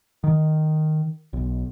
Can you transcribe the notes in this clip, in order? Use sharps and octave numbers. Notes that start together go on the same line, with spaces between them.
D#3
B1